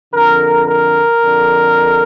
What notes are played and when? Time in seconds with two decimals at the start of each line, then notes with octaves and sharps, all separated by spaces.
0.14 F2 D3 A#4
0.68 A#4
1.23 F2 D3